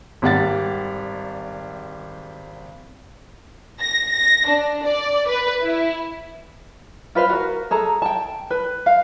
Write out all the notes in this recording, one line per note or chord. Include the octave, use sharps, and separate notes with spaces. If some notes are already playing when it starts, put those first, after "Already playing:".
G#1 G3 F#5 A6
A#6
A#6
D4
D5
B4
E4
F4 B4 C5 F5
F#4 A#4
G#4 A4 A#5
G5 A5
B4
F5